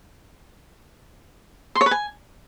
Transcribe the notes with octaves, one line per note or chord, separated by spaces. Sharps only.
C6
C#5
B4
G#5